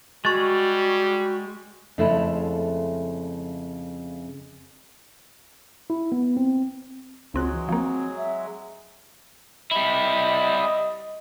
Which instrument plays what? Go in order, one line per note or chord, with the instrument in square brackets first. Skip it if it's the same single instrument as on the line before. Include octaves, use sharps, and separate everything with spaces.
[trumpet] G3 [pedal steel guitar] G#3 [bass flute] F#4 [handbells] C#6 A6
[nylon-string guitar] F2 C#3 G#3 A3 C#4 E4
[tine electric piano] E4
B3
C4
[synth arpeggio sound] C#2 C4 F#6 [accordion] F#3 G#3 [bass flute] F4
[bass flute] E3
[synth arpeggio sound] F3 A#3 [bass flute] C4
[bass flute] E5
[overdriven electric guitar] G3 E4 [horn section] D#5